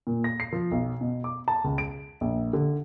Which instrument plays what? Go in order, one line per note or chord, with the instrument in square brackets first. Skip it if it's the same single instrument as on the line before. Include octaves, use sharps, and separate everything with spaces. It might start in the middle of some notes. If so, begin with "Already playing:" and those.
[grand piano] A#2
A#6
C7
F3
B1
B2
D6
A5
C#2
D7
A#1
D3